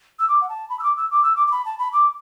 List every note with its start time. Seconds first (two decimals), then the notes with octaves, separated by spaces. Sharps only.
0.19 E6
0.28 D6
0.41 F#5
0.49 A5
0.69 B5
0.79 E6
0.83 D6
0.97 E6
1.11 D6
1.23 E6
1.36 D6
1.47 D6
1.52 B5
1.66 A5
1.79 B5
1.93 D6